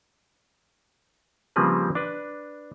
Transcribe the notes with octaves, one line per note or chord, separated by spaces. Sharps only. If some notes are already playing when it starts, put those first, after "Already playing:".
C#3 F3 G3 A#3 C4 B4
D4 B4